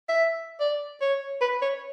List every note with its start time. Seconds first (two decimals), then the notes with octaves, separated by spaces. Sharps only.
0.09 E5
0.60 D5
1.01 C#5
1.41 B4
1.62 C#5